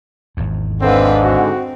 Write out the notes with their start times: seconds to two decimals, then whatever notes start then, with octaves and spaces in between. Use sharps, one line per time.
0.37 G#1 E2
0.81 G#2 D3 C4 A4 B4 F5
1.24 C4 F#4